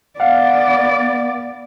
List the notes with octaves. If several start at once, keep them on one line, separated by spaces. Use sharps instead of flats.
B3 D5 F5 F#5